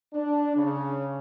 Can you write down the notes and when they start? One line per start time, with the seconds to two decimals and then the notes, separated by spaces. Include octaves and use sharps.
0.14 D4
0.56 C#3